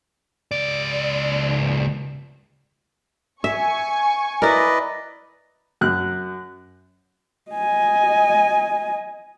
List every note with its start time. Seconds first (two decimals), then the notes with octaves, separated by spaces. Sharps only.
0.52 C#2 D5
3.44 E5 G#5 C#6
4.42 E4 A#4 B4 D5 D#5
5.81 F#2 F#6
7.51 D#5 G#5